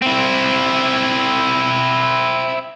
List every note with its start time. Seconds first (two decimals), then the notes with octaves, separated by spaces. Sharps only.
0.02 C4 E4